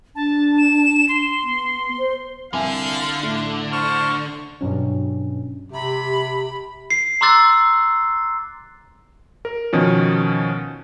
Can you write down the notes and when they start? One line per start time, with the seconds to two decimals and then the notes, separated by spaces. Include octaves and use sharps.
0.16 D4 A5
0.57 E7
1.09 C6
1.43 B3
1.98 C5
2.53 C2 D3 E5 F5 G#5
3.23 A2
3.72 C5 A5 C#6 F6
4.61 G2 B2 F#3 C#4
5.72 C3 G4 B5
6.90 C7
7.21 A#5 C6 D6 E6 F#6 A6
9.45 A#4
9.73 B2 D#3 F3 C#4